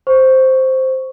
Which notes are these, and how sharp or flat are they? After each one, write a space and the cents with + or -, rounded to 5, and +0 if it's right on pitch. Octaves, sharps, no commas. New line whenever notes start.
C5 +0 C#6 +5